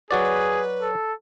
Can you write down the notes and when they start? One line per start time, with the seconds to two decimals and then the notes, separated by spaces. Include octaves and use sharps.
0.11 F#3 F#4 G#4 B4 D5
0.81 A4